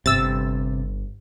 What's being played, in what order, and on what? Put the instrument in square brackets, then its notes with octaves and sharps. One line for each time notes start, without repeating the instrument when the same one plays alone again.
[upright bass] G1 [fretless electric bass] C3 [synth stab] E6 A6